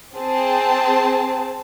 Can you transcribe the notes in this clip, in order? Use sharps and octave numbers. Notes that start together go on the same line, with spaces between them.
C4 G#4 A5